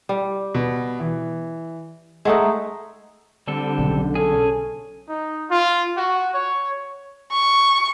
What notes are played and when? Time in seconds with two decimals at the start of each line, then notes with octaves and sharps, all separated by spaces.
0.09 G3
0.55 B2
1.00 E3
2.25 G#3 A3 D#4 E5 F#5 E6
3.48 D3 G3 C4 A4
3.79 B1 C#3
4.15 C#4 G#4 A4
5.08 D#4
5.49 F4
5.97 F#4
6.34 C#5
7.32 C#6